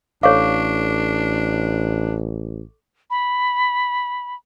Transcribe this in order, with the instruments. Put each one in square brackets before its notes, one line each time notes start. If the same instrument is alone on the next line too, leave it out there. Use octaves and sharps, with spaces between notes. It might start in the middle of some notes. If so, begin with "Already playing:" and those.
[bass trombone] A1 [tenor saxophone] D4 [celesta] A4 C#6 D6 [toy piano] C#5 F5
[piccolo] B5